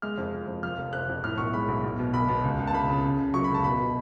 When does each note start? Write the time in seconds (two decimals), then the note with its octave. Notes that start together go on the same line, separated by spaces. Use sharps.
0.02 G#3 F6
0.18 F2
0.33 F3
0.48 F2
0.63 F3 F6
0.78 F1
0.93 F2 F#6
1.09 F2
1.24 A2 F6
1.38 B1 C#6
1.53 G#3 B5
1.68 B1
1.84 B1
1.99 B2
2.14 B1 B5
2.28 B2
2.43 C#2
2.59 C#2
2.67 A5
2.73 C#2 B5
2.88 C#3
3.04 C#3
3.19 C#3
3.33 F#3 C#6
3.44 B5
3.50 C#2 A5
3.64 B2 B5
3.79 B2